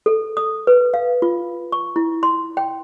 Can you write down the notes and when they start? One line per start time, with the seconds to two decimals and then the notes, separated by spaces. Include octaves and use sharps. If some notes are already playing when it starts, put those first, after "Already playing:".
0.06 A4
0.37 D#6
0.67 B4
0.94 F5
1.22 F4
1.72 C#6
1.96 E4
2.23 C6
2.57 G5